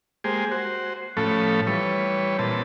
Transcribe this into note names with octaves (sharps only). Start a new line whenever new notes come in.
G#3 A#3 G4 G#4 C5
F#4 C5
A2 F3 A3 C#4 A4 B5
E3 G3 B4 C#5
A#2 E3 C4 B4 A5